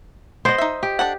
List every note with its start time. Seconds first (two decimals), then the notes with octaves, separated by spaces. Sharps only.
0.45 G#3 B3 C5 D#5
0.58 D#4 E5
0.83 G4
0.99 D4 A4 F#5